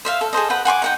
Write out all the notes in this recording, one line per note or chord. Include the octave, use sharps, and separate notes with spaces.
C5 E5 F5
A4
G#4 A4 C5 D#5
B4 F#5 G5
F#5 G#5 C6 D6
D#4 F#5 G5